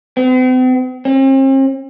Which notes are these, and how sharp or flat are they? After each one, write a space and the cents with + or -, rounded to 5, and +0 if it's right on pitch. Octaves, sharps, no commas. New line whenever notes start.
C4 -45
C4 +45